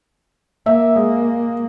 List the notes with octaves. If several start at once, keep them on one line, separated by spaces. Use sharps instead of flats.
A#3 E5
G#3